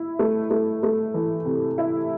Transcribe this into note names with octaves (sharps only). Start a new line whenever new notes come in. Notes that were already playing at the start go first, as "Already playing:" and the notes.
Already playing: E4
A3
A3
A3
E3
C3
E4